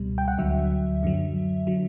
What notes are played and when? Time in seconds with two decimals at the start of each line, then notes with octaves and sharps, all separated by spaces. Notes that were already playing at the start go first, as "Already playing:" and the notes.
Already playing: C#2 B2 G3
0.18 G5
0.28 F#5
0.38 D2 D3 F#3 E5
1.03 F#2 D3 F#3
1.67 D3 F#3